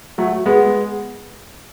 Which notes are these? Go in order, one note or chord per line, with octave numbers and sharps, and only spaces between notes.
F#3 A3
G#3 B3